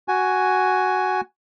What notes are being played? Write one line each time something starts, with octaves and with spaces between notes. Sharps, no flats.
F#4 G#5